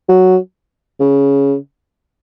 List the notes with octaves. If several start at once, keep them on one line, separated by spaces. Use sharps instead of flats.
F#3
C#3